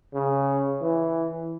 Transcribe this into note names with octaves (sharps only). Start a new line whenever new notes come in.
C#3
E3